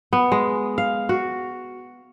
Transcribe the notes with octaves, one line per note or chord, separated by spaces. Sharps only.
B3
G#3
F5
F#4